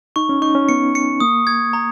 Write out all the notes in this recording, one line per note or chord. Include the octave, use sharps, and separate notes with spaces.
D#4 C#6
C#4
D#4 C#6
C#4
B3 C#7
C#7
A#3 D#6
G#6
A#5